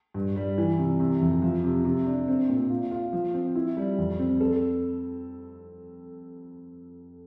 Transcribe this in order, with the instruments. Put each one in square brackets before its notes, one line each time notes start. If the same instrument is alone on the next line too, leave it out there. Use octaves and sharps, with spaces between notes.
[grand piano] G2
G3
E3
C3
C3
F2
F3
C3
C3
D4
C4
A#2
F4
F4
F3
C4
E4
G3
F2
C4
A4